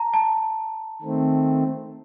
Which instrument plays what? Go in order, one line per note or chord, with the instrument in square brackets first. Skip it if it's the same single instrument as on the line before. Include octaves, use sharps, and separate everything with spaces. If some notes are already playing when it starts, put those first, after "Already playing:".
Already playing: [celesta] A5 A#5
A5
[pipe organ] D#3 A3 C4